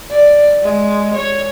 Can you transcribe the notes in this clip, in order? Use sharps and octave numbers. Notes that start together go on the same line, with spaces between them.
D5
G#3
C#5